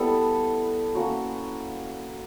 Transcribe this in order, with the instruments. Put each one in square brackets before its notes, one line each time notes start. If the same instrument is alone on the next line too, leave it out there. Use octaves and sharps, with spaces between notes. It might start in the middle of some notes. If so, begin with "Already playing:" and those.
Already playing: [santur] G3 B3 E4 A4
A#3 C#4 F#4